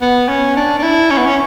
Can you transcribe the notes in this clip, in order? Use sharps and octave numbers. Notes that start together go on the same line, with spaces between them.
B3
C#4
D4
D4
E4
C#4
B3
C#4